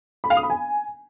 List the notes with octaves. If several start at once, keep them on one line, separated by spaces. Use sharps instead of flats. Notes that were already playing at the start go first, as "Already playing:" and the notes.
B5
F5
D#6
B5
G#5